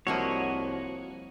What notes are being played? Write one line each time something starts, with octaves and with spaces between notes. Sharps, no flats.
C2 F3 A#3 E4 F#4 C#5 D#5